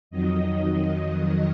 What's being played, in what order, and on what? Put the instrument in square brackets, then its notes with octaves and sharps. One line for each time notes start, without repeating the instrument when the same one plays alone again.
[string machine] F2 D#3 F#3 D#5